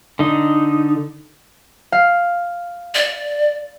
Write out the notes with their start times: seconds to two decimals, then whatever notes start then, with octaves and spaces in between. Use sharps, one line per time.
0.19 D3 D#4
1.92 F5
2.95 D5